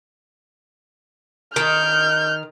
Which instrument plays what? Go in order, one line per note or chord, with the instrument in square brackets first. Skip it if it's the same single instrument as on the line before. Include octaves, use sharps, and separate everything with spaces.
[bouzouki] D#3 [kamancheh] F6 [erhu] G6